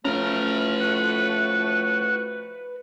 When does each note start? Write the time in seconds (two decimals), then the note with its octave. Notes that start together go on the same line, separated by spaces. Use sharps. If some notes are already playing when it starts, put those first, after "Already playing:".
0.05 A2 F3 A3 C#4 B4 A#5 F6
0.80 F#4